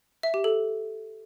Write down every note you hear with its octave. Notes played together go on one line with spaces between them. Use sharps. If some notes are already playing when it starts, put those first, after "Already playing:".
E5
G4
A4